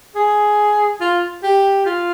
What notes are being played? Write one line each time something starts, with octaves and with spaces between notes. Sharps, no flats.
G#4
F4
G4
F4